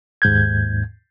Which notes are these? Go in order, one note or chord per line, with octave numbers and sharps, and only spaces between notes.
D#2 G#2 G6 G#6